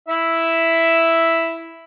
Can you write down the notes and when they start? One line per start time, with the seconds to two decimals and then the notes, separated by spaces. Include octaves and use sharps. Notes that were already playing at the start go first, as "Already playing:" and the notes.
0.08 E4 E5